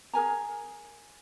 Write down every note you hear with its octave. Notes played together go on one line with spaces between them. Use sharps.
G#4 A#4 G#5 A#5